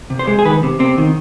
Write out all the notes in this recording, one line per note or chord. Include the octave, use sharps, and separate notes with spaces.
C3
C5
G#3
G#4
D#3 B4
C3
C3 C4
D#3